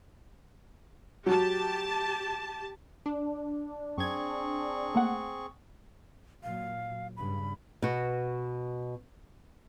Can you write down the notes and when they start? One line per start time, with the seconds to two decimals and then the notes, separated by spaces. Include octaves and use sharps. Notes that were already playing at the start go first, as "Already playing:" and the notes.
1.26 F#3 G4 A5
3.06 D4
3.98 F#2 C4 G#4 C#6 G#6
4.95 A3 A#3 F#5
6.43 A#2 F#3 F5
7.17 G2 C#3 B5
7.82 B2 F#4